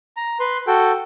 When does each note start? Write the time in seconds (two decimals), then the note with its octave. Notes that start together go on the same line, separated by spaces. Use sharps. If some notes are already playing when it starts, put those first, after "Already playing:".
0.17 A#5
0.40 B4 C6
0.67 F#4 A4 G5